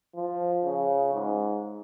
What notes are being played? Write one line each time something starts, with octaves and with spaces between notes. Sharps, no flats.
F3
C#3
G#2